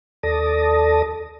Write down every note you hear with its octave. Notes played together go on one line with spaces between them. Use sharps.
D#2 A4 D5 A5 D#6 A#6